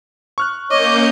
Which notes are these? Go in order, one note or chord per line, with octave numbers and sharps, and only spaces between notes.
C#6 F6 F#6
A#3 C#4 C#5 D#5 D6 G6